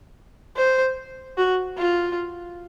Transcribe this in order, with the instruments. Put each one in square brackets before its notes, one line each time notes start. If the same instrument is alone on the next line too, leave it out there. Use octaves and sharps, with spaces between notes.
[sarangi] C5
F#4
F4